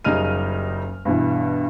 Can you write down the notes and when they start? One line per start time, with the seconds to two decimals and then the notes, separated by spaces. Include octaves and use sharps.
0.05 F#1 C#3 G3 D#4 F6 D#7
1.05 G2 B2 E3